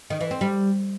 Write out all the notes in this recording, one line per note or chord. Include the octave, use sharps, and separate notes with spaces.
D#3
E3
C4
G3